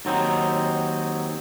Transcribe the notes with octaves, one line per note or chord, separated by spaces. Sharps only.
D#2 F#3 C4 D#4